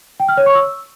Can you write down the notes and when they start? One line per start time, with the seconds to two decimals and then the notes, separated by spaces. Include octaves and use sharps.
0.20 G5
0.29 F6
0.37 C#5
0.46 C#6
0.55 E6